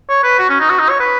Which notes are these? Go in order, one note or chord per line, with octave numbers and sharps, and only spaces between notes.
C#5
B4
F#4
C#4
D#4
F#4
D#4
C#5
B4